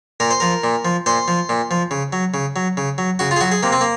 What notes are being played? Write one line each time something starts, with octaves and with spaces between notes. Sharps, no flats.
A#2 A#4
C5
F3 A#4
A#2
F3
A#2 C5
F3
A#2
F3
C#3
F#3
C#3
F#3
C#3
F#3
C#3 F#4
F4
G#4
F#3 F#4
G#4
C3 A#3
C4
A#3